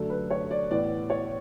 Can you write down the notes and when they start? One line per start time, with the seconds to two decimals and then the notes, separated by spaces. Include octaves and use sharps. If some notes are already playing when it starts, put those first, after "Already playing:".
Already playing: F#2 D3 A3 A4
0.10 B4
0.31 C#5
0.51 D5
0.70 A2 E3 B3 D5
1.10 C#5